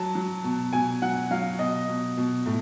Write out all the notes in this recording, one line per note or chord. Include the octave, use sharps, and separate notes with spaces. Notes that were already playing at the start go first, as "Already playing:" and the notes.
Already playing: F#3 A5
F#3
B2
B2 G#5
F#3 F#5
F#3 F5
B2 D#5
B2
B2
A2